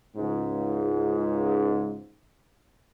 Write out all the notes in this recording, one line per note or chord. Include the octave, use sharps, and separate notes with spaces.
C#2 G#2